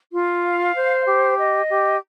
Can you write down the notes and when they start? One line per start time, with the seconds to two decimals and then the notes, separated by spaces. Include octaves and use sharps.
0.13 F4
0.44 F5
0.75 C5
1.06 G4
1.38 D#5
1.69 G4